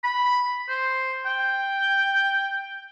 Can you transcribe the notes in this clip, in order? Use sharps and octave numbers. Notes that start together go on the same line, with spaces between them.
B5
C5
G5